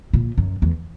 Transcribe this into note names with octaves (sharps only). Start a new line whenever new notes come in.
A#2
F#2
E2